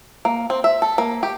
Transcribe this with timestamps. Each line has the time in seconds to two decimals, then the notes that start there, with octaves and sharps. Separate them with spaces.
0.25 A#3
0.50 C4
0.64 E5
0.82 A4
0.98 A#3
1.23 G4